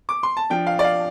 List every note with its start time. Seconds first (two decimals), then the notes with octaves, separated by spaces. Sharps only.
0.09 D6
0.23 C6
0.37 A5
0.50 F3 D4 G5
0.67 F5
0.79 D5
0.84 F5